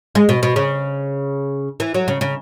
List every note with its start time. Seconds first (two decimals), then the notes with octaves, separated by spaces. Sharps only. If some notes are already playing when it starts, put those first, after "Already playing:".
0.15 G#3
0.29 B2
0.43 B2
0.56 C#3
1.80 E3
1.94 F#3
2.08 C#3
2.21 C#3